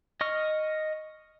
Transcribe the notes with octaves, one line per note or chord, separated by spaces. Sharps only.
D#5 C#6 F6